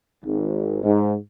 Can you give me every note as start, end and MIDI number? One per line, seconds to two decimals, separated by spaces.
0.25 0.80 32
0.83 1.15 44